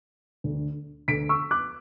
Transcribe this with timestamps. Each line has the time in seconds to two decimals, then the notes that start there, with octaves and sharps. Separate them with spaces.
0.44 D2 D3 A3
1.08 D2 D3 A3 B6 D7
1.29 C#6 E6
1.51 D6 F#6